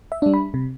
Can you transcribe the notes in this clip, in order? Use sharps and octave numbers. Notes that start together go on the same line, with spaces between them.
E5
G3 D4
B5
C3